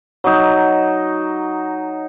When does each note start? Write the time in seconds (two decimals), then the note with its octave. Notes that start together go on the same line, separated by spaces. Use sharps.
0.24 F#3 D#4